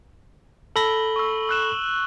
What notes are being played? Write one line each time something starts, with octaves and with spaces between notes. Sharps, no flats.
A4 B5 A#6 F#7 G7
C#6 E6
E6 F#6 E7